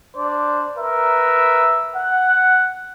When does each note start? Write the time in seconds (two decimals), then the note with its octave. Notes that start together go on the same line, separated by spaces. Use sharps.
0.16 D4 C5 D5
0.78 A#4 B4 E5
1.95 F#5